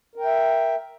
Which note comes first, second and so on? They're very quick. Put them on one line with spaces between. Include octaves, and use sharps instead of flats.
A#4 G5 E5